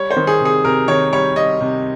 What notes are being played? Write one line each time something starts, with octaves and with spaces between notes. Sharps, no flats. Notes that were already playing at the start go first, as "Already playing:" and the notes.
Already playing: G3 C#5
C5
D#3
G#4
C3
G#4
C3 A#4
D#3 C#5
G3 C#5
G3 D#5
C3